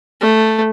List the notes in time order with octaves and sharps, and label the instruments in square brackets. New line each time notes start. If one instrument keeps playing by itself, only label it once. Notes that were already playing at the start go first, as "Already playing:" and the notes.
[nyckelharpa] A3